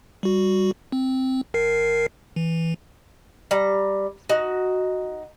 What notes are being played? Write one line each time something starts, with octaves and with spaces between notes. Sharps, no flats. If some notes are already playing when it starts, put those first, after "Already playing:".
G3 F#4
C4
G#1 A#4 C7
E3
G3 A#5
D#4 F#4